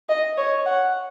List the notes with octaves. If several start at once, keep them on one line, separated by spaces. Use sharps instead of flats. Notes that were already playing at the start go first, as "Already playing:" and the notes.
D#5
C#5
F#5